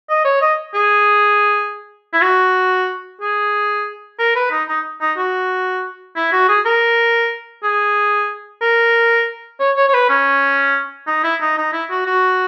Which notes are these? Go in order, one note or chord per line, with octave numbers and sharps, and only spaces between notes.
D#5
C#5
D#5
G#4
E4
F#4
G#4
A#4
B4
D#4
D#4
D#4
F#4
E4
F#4
G#4
A#4
G#4
A#4
C#5
C#5
C#5
B4
C#4
D#4
E4
D#4
D#4
E4
F#4
F#4